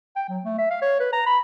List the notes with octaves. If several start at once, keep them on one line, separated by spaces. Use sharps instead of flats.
G5
F#3
A3
E5
F5
C#5
B4
A#5
B5